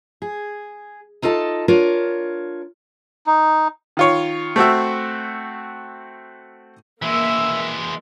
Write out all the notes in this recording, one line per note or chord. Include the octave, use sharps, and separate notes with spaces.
G#4
D#4 F4 A4 D#5 A5
D4 F4 A#4 C#5
D#4
D#3 F4 C#5
A3 C4 F#4 E5
E3 G#3 A#3 E5 E6